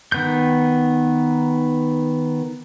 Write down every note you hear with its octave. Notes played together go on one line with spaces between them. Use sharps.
D#3 B3 G6